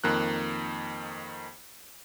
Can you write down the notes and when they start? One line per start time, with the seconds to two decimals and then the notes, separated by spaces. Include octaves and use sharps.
0.04 F2 D#3 A#3 F#6